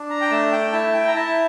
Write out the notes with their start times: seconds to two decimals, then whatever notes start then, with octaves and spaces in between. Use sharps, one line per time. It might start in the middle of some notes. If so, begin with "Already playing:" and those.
Already playing: D4
0.10 A#5
0.21 G5
0.31 A3 A5
0.52 G5
0.72 E4 A5
0.93 G5
1.07 A#5
1.14 E4 A5